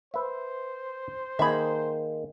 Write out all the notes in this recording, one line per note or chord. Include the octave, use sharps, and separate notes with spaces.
B4 C5 E5
D#3 A#3 G#4 E5 B5